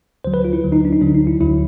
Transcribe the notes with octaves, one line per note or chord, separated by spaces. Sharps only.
D2 D3 F#3 C5
B4
F4
E4
D2 D3 F#3
D#4
D4
D#4
D2 D3 F#3 D4
D#4
E4
D2 D3 F#3 E4